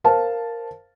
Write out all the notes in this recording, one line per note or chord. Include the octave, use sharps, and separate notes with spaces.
A#4 C5 F5 A5